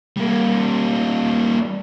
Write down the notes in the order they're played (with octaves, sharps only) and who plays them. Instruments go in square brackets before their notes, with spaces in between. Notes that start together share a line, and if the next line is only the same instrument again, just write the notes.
[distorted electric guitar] G3 A#3